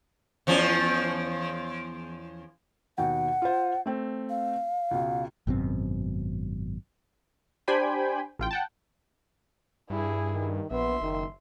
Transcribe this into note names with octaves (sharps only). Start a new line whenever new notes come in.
E2 F3 C#4
D#2 B2 F#5 G5
F4 C5
A3 C4
F5
C#2 B2
G#1 F#2 B2 C4
D4 G4 C5 G5 G#5 B5
A1 F4 G5
F#5 G5 A5
G2 E4 G#4
D#3
A#1 B3 E5 C6
F#1 D#3